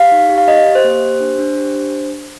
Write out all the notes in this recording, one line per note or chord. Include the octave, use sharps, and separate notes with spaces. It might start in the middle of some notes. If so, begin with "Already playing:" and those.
Already playing: G4 F5
D#4
G4
F5
G4 D#5
G4
C5
A#3
G4
D4
D4
G4
D4